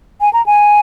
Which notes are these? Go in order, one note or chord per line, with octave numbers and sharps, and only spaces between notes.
G#5
A#5
G#5